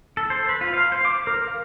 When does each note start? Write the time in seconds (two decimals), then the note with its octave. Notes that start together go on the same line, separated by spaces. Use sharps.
0.17 A4
0.30 C5
0.49 B4
0.61 F4
0.74 F5
0.92 C5
1.05 D6
1.27 A#4
1.48 F5